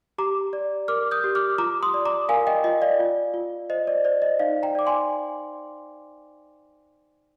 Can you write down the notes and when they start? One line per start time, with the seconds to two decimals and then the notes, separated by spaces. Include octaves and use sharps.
0.18 G4 A#5 D6
0.53 D5
0.88 A#4 D6 F6
1.11 D#6 G6
1.24 G4
1.35 D6 F6
1.58 F4 A#5 D6
1.83 C6 D#6
1.94 D5
2.06 A#5 D6
2.29 A#4 F5 G#5
2.47 D#5 G5
2.64 F4 D#5
2.82 D5 F5
2.99 F4
3.34 F4
3.70 C5 D#5
3.87 D5
4.05 C5 D5
4.22 D#5
4.39 D#4 D5 F5
4.63 G5 A#5
4.75 D5 D6
4.87 G#5 C6